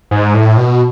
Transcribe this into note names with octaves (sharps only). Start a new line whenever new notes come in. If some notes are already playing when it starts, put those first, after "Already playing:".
G#2
A2
B2